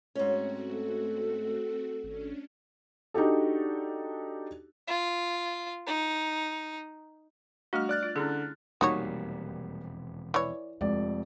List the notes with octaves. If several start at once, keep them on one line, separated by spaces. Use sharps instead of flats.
G#2 A3 C4 C#4 F#4
A4
G#1 C#4 D4
D4 D#4 F#4 G4 A4
F4
D#4
G3 A3 D4 F#4 F6
D5 F#6 A6
F4
D3 C#4 E4 G#4
E1 F2 C3 G3 A#3 D#4 F#4 C#5
E3 C#5 D5
F1 F2 G#3 D5